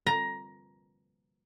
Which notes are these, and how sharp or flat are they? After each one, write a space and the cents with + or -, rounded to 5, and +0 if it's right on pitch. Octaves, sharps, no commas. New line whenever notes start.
A#5 +15